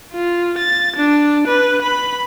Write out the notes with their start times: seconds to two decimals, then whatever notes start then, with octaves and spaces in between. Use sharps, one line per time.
0.13 F4
0.58 A6
0.96 D4
1.48 B4
1.82 B5